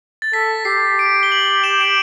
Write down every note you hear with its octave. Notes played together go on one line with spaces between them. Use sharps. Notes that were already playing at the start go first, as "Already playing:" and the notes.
A6
A4 B6
G4 C7
D7
G7
F#7
E7
D7